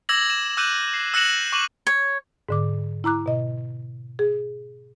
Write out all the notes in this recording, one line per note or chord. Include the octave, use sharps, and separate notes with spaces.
D6 E6 G#6 A#6 F#7
E7
D6 E6 F#6 G6 D#7
C7
E6 F#6 A#6 C#7 E7 F#7
C#6 D6 D#7 F#7
C#5
G#2 D3 D6
E4 A#5 D6 F#6
B2 D#5
G#4